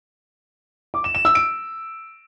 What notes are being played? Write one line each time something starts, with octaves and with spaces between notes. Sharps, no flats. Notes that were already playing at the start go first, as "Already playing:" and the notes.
D6
E7
E7
E6
D7